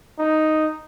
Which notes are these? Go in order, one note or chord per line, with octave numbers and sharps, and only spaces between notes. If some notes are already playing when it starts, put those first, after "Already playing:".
D#4